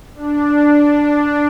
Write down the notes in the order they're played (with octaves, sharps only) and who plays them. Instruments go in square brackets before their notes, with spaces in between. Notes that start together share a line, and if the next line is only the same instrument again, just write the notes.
[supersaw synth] D4
D4